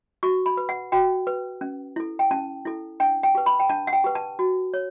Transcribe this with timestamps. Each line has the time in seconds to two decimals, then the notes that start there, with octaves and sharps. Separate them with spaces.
0.23 F#4 C#6
0.46 B5
0.57 B4
0.69 F#5
0.92 F#4 G5
1.27 B4
1.61 C#4
1.96 E4 A4
2.19 G5
2.31 C#4 A5
2.65 E4 A4
3.00 D4 G5
3.23 G5
3.35 G4 B4
3.46 B5
3.60 G5
3.69 D4 A5
3.87 F#5
3.93 G5
4.04 G4 B4
4.15 A5
4.39 F#4
4.74 C#5